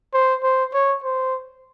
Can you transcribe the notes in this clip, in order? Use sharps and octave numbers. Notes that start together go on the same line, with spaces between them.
C5
C5
C#5
C5